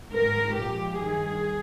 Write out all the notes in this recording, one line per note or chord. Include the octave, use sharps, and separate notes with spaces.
G#2 D#3 G#3 A#4
A#2 F3 G#3 G4
G2 D#3 G3 G#4